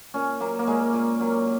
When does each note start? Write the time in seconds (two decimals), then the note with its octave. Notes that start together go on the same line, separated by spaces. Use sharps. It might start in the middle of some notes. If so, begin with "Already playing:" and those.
0.14 A#2 C#4
0.40 F#3 A#3
0.59 A#3
0.67 A#2 G#3
0.94 A#2
1.21 F#3